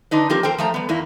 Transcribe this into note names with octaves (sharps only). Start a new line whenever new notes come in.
D3 D4 D#4 B4
F3 A#3 C4 F4 G4 A#4
A4 A#4 C5 G5
F3 A3 A#5
G3 B3
E2 A#3 E4